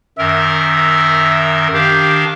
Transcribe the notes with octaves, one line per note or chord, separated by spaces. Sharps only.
F#2 D#3 A#4 E5
D#3 D4 G4 F5